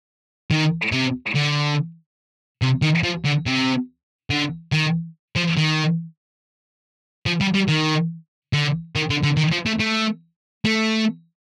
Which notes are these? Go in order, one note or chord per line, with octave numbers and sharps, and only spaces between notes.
D#3
C3
D3
C3
D#3
F3
D3
C3
D3
D#3
F3
D#3
F3
G3
G3
D#3
D3
D#3
D3
D3
D#3
F3
A3
A3
A3